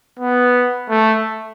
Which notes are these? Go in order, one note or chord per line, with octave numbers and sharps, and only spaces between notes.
B3
A3